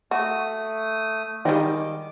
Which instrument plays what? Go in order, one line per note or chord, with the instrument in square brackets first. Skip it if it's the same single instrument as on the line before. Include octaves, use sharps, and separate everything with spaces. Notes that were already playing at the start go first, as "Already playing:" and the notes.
[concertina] A3 D#6 [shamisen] F#4
[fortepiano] D#3 D#5 [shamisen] G3 G#3 [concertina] D6